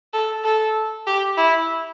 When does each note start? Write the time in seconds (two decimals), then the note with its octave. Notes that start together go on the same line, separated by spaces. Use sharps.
0.14 A4
0.44 A4
1.07 G4
1.37 E4